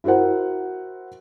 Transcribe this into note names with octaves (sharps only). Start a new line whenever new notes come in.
E4 F#4 A#4 C5 F#5